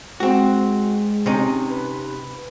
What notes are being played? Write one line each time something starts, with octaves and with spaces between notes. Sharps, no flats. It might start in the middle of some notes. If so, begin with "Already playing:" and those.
G#3 C4 F#4
C3 C#4 D#4
B4